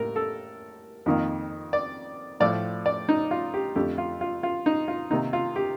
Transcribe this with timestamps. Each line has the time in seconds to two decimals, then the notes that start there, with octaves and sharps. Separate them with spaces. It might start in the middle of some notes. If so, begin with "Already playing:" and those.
Already playing: A2 G3 A#3 A#4
0.16 A4
1.06 F2 D#3 A#3
1.73 D5
2.40 A2 F3 A3 D5
2.86 D5
3.09 D#4
3.31 F4
3.54 G4
3.76 F2 D3 A3 G4
3.98 F4
4.21 F4
4.43 F4
4.66 D#4
4.88 F4
5.11 C3 D#3 A#3 D#4
5.33 F4
5.56 G4